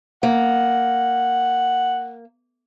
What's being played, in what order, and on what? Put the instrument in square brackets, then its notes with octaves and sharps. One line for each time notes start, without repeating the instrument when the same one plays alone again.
[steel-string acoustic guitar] A#3 [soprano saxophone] F#5